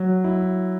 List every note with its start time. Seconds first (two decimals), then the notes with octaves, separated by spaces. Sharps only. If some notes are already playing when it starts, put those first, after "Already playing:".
Already playing: F#3
0.24 E4